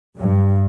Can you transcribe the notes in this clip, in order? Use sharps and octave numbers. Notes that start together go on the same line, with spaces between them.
G2